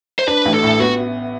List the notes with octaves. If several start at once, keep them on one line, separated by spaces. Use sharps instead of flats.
C5
D4 B4
A1
A4
A2
B3 F#4